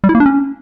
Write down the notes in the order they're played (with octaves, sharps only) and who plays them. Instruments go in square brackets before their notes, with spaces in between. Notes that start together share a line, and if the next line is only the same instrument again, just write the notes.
[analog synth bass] G3
E4
A#3
D4
C#4